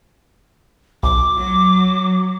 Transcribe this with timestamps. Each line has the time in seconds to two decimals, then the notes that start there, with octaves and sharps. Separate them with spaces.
1.03 B1 D6
1.36 F#3